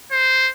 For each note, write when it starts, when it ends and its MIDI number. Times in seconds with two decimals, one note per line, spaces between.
0.11 0.50 72